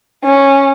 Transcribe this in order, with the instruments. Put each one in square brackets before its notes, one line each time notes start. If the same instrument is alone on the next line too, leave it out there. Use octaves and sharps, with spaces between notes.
[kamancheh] C#4